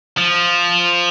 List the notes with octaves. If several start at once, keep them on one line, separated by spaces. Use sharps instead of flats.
F3